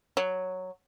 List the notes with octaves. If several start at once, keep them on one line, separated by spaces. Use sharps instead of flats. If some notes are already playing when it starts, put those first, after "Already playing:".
F#3